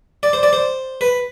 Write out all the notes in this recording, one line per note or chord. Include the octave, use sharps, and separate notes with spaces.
D5
C5
D5
C5
B4